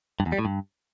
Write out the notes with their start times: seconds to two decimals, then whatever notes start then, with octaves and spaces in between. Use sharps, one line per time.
0.20 G2
0.26 E2
0.32 G3
0.39 A2
0.45 G2